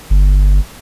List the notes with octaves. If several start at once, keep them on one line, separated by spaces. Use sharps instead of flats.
G1